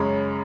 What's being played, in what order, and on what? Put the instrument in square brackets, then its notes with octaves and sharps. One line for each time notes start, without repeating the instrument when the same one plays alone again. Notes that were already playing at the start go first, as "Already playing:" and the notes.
Already playing: [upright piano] F#2 C#3 G#3 C#4 B5